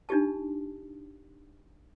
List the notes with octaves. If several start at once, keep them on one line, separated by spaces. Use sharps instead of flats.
D4 D#4 F4 G4 A5